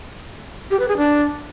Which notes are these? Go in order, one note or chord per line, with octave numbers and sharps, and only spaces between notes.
G4
B4
G#4
D4